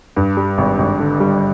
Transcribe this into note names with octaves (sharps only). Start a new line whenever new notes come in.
G2
G3
G#1
G#1
D3
G3